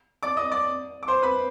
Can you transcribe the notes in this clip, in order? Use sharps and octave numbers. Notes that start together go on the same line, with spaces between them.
D5 D6
D#5 D#6
D5 D6
D6
C5 C6
B4 B5